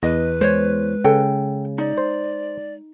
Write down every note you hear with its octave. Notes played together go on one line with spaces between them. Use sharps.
E2 B4 D#5
G#3 C5 C#5
C#3 A4 G5
D#4 D5
C5